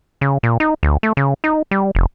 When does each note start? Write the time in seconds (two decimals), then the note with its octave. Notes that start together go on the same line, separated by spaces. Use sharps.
0.21 C#3
0.43 A#2
0.60 D#4
0.83 D2
1.03 A3
1.17 C#3
1.44 D#4
1.71 G3
1.95 F1